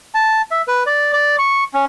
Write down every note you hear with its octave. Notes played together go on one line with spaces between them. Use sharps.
A5
E5
B4
D5
D5
C#6
C#4